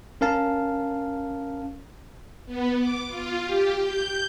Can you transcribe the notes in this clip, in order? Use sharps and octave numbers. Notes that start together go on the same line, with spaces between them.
C#4 A#4 F5 A5
B3
D6
F4
G4
G6